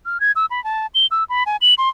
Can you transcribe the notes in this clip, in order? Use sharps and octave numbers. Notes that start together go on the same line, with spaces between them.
F6
G#6
E6
B5
A5
G7
E6
B5
G#5
F#7
C6